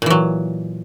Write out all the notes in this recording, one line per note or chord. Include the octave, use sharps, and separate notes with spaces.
A#2 E3 F#3